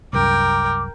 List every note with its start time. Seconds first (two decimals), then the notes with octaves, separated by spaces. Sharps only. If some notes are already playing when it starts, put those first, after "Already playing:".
0.13 C2 F#2 A#4 G5 D6